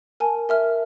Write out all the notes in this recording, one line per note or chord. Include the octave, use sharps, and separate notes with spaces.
A#4 G#5 A5
A#4 E5 F6